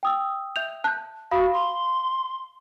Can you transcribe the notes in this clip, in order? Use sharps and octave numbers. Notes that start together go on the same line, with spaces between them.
G5 D#6 E6
E5 G6 F7
A5 F#6 G6
F#4 F5 B5 D#6
C6